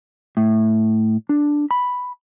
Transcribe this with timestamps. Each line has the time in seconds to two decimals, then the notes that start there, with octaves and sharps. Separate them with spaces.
0.37 A2
1.29 D4
1.71 B5